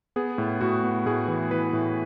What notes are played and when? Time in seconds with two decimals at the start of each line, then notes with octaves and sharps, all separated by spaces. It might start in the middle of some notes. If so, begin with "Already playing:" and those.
0.16 B3 G#4
0.38 A2
0.61 A2 F#4
0.84 B3
1.06 A2 G#4
1.28 E3
1.51 E3 B4
1.73 A2